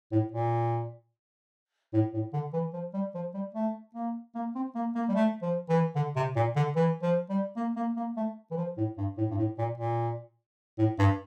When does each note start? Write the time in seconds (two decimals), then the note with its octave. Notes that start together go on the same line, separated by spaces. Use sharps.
0.12 A2
0.32 A#2
1.93 A2
2.14 A2
2.33 D3
2.53 E3
2.73 F3
2.94 G3
3.14 F3
3.34 G3
3.54 A3
3.94 A#3
4.35 A#3
4.55 C4
4.75 A#3
4.95 A#3
5.09 G3
5.15 A3
5.42 F3
5.69 E3
5.95 D3
6.16 C3
6.36 A#2
6.56 D3
6.76 E3
7.02 F3
7.30 G3
7.57 A#3
7.76 A#3
7.96 A#3
8.17 A3
8.51 E3
8.57 F3
8.77 A2
8.97 G2
9.18 A2
9.31 G2
9.38 A2
9.58 A#2
9.78 A#2
10.78 A2
10.99 G2